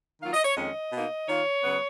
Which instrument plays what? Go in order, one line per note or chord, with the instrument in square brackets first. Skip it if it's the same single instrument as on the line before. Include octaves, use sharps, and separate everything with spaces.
[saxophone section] D#3 F#3 A#3 F4 F5
D#5
C#5
F2 D#3 G#3 C#4 D#5
B2 A#3 D#4
D#3 A#3 F4 C#5
C#3 F#3 B3